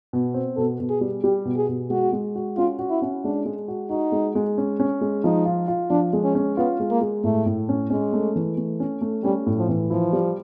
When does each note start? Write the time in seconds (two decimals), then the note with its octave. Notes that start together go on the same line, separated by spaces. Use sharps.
0.13 B2
0.34 C4
0.57 B2 A4
0.80 B2
0.90 G#4
1.01 G3
1.23 G3 G4
1.45 B2
1.57 G#4
1.69 B2
1.90 G#3 F#4
2.13 G#3
2.35 F#4
2.57 C#4 F4
2.79 F#4
2.90 E4
3.02 C#4
3.24 G#3 D4
3.45 G#3
3.68 F#4
3.90 D#4 F#4
4.12 G#3
4.35 G#3
4.58 C#4
4.80 C#4
5.01 G#3
5.24 F3 D#4
5.45 F4
5.68 F4
5.90 F3 D4
6.13 G#3
6.23 C#4
6.35 C#4
6.57 B3 F4
6.80 G#3
6.91 A#3
7.01 G#3
7.24 A2 A3
7.46 A2
7.69 C#4
7.90 G#3 C#4
8.13 A3
8.36 E3
8.57 A3
8.80 C#4
9.01 A3
9.23 G3 C#4
9.46 A2
9.58 F3
9.69 E3
9.90 F3 E4
10.13 G3